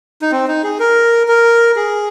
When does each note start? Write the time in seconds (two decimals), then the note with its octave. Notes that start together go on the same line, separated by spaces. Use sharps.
0.22 D#4
0.31 C4
0.48 D#4
0.64 G#4
0.80 A#4
1.28 A#4
1.76 G#4